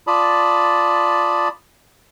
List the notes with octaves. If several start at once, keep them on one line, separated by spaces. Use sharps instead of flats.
F4 D5 A5 B5 D#6